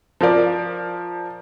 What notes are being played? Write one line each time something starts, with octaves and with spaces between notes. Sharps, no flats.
F3 A#4 D5